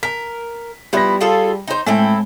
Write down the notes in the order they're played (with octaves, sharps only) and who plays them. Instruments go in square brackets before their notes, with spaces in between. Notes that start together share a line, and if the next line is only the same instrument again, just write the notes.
[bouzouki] A#4 [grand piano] B6
[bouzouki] F3 B3 E4 [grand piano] G3 A#6
[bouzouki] F4 G#4 A4
D#4 C5
[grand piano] A2 [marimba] G#3 [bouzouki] C4 E4 A4